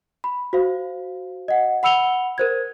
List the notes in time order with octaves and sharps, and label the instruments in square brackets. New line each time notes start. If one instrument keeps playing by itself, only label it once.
[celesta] B5
F#4 C5 F5
D#5 F#5
F#5 B5 E6 C#7 F7 G7
A#4 C5 G#6